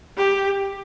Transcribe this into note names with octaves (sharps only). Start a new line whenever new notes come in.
G4